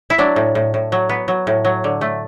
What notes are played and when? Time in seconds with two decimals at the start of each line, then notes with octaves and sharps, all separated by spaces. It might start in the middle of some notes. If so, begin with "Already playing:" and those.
0.10 E4
0.18 F#3 D4
0.36 A2
0.55 A2
0.74 A2
0.92 F#3
1.09 B3
1.28 F#3
1.47 A2
1.65 F#3
1.84 D3
2.01 A3